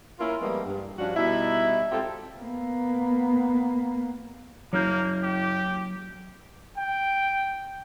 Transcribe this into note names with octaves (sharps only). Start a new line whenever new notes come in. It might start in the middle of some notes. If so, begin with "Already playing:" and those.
A#3 C#4 E4 F4 A#4
F3 G3 G#3 A#3 B3
G2
G2 F3 C#4 D4 F#4
B2 G3 D#4 E4
G#2 C4 F4 G4 A4
A#3 B3
F#1 F#3 A#3 C#5 F6 G6
G4
G5